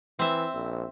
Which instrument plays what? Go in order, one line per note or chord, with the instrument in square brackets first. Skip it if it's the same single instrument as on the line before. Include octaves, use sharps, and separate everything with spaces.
[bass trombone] E3 [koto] C4 E5
[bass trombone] A#1